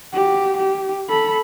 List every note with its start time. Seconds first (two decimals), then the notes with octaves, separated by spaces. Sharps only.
0.13 F#4 G4
0.57 G4
1.09 A4 B5